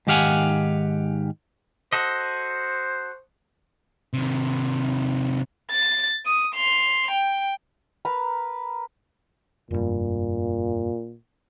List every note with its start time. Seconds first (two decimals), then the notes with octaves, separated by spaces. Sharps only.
0.07 G#2 D#3 G4 F5 F#5 G#5
1.93 F#4 A4 C5 D#5
4.13 C3 D#3
5.71 A6
6.26 D#6
6.55 C6 F7
7.11 G5
8.05 A#4 B4 A#5
9.71 F1 G2 A#2